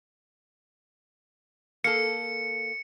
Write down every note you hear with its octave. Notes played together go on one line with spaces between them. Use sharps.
A#3 A4 C#7